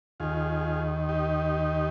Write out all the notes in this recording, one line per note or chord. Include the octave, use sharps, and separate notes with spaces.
D#2 D#3 F4 G#4
D#4 G4